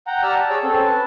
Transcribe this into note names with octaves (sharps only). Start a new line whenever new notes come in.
F#5 G5 A#5
G4 D5 F#5 A#5 E6 F6
A5
G#4 C#5 D5 E6
C4 C#4 A4
B4 A5